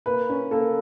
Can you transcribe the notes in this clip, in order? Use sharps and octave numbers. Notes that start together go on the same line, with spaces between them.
A#3 B4
C#4
A#3 A4